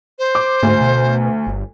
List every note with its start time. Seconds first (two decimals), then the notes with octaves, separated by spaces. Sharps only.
0.19 C5
0.35 D6
0.63 D2 G#2
0.81 B2
1.47 G1